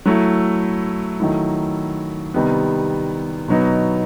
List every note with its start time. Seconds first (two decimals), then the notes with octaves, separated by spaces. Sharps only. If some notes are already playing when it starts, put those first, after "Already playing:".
0.06 F#3 A3 E4
1.20 D#3 F#3 A3 E4
2.34 C3 D#3 G3 B3
3.48 B2 F#3 B3 D#4